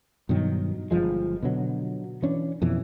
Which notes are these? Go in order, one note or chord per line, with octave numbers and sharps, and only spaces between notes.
G2 B2 D#3 F#3
G1 F#2 F3 G#3
B2 D3 F#3
E3 C#4 D4
F2 B2 E3